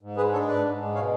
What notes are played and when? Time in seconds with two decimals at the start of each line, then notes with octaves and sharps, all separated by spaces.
0.02 G#2
0.17 G#3 G#4 B4
0.32 D4 A4 C#5
0.48 G#2 B4 D5
0.64 G#2
0.79 G#3
0.95 B2 C#5 F5